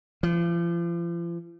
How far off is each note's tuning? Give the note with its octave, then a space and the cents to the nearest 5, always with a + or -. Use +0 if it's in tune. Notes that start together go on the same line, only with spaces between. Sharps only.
F3 -40